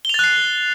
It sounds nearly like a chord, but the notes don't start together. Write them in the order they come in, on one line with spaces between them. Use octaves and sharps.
G7 F7 A6 F#6 C7